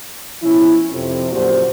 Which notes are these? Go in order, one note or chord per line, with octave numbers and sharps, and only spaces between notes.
B2 F3 C#4 E4
F2 C3
F#2 A#2 D3 F#4 G4 C5